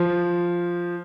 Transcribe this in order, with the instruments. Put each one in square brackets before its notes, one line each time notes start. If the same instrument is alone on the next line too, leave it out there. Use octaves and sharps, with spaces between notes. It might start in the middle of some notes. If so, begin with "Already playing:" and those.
Already playing: [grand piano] F3